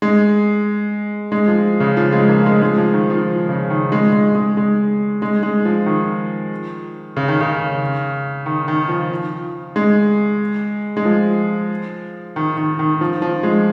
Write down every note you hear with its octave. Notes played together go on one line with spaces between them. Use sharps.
G#3
G#3
F3
C#3
F3
G#3
A#3
G#3
G#3
F3
D#3
F3
C#3
D#3
G#3
G#3
G#3
G#3
G#3
G#3
F3
D#3
C#3
D#3
C#3
D#3
D#3
F3
G#3
G#3
F3
D#3
D#3
D#3
F3
F3
G#3